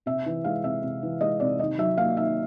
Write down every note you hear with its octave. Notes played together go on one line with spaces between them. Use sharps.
C3 E5
E3
G#3 F5
C3 E5
C3
E3
G#3 D#5
C3 D5
D#3 D#5
F#3 E5
A#3 F5
D#3 E5